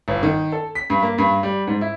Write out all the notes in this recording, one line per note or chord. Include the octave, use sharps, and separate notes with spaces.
G1
D#3
A4
B6
G2
A#3
G2
G3
G#2
E4